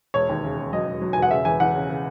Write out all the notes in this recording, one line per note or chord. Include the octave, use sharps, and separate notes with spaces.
E1 C#5
D#2
C#3
C#3
F#3 D#5
E1
F#3
G#5
E1
F#5
C#3 E5
E2 G#5
E2 F#5
C#3
C#3